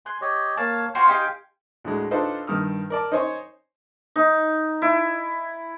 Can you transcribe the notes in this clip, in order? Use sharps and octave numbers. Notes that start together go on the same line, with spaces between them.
G#5 C6 F#6
G4 C#5 D#5
A#3 C#5 F5 A5
F4 F#4 C5 F5 G5 G#5
D#4 G4 C6
D2 A2 D3 G#3
D4 D#4 F4 A4 B4 C5
G2 D#3 D#6 F6
A#4 D5 A5
D#4 C5 C#5 G#5 C#6
D#4
E4